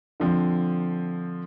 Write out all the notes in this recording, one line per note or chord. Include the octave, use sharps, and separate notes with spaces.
D3 F3 C4